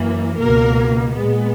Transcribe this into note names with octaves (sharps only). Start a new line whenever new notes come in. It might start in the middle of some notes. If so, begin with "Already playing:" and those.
Already playing: F#2 E3 A#3
C#2 B2 A#3 A#4
A#2 G#3 B3